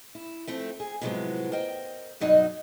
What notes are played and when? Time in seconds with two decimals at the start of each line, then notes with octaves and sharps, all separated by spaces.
0.15 E4
0.47 F3 A3 C4
0.80 G#4
1.01 A2 C3 F3 F#3 G#3 B3
1.52 A#4 C5 D#5 G5
2.20 G2 B2 F#3 D#4 F#4 D#5